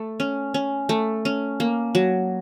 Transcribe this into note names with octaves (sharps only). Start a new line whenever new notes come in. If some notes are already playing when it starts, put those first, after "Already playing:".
Already playing: A3
C#4
C#4
A3
C#4
A#3
F#3